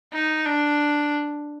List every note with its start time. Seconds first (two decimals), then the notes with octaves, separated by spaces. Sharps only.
0.13 D#4
0.45 D4